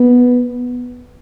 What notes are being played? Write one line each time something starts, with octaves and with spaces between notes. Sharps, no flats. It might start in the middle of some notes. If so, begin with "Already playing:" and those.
Already playing: B3